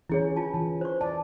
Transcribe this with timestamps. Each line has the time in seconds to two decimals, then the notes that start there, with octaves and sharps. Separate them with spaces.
0.09 E3 C#4 E4 G#4 C#5
0.36 F4 A5
0.54 E3
0.81 C5 C#6
1.01 D5 A5